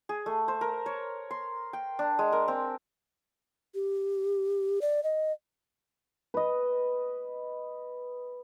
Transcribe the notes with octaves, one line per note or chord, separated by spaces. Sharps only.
G#4
A3
C5
A#4
C#5
C6
G5
D4
G#3
A#4
C4
G4
D5
D#5
B4 D#5